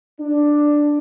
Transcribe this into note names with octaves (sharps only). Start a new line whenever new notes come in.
D4